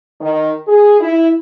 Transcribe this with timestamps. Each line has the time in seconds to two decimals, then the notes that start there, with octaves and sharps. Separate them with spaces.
0.21 D#3
0.68 G#4
1.00 E4